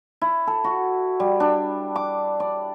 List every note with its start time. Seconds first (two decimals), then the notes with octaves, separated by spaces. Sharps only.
0.21 E4
0.47 A4
0.64 F#4
1.20 G3
1.40 D4
1.96 D6
2.40 D5